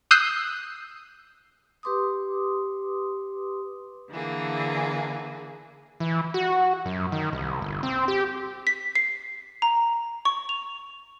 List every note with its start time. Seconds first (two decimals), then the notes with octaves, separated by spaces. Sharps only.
0.11 D#6 E6 F#6 G6 C7
1.83 G4 B4 C6 D6 D#6
4.11 D3 E3 A#3 G#4
6.00 E3
6.34 F#4
6.86 F#2
7.12 D#3
7.33 C2
7.62 G1
7.83 C4
8.08 G4
8.67 B6
8.95 C7
9.62 A#5
10.25 C#6
10.49 F7